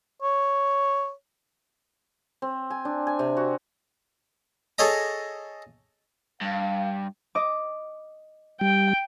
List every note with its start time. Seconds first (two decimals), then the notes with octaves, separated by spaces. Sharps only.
0.23 C#5
2.42 C4
2.70 G#5
2.85 D4
3.07 G#5
3.19 C3
3.37 F#4
4.78 G#4 A4 C#5 D#5 A#5
6.41 G2 F5
7.35 D#5 D6
8.61 G3 G5